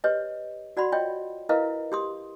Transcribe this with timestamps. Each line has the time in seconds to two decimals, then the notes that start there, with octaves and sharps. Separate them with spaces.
0.04 G4 B4 C#5 D#5
0.77 F#4 D5 F#5 B5 C6
0.92 F4 C#5 D#5 G5
1.49 E4 A#4 B4 D#5 F5
1.92 G4 C6 D#6